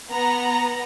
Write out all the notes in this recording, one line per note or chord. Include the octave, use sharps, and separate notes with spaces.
B3 A#5